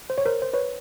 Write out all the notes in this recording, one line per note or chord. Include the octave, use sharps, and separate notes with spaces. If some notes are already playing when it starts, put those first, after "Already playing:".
C5
C#5
A#4 C5
C5
B4 C#5